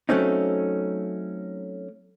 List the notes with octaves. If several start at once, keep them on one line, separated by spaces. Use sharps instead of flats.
F#3 A3 C4 C#4 D#4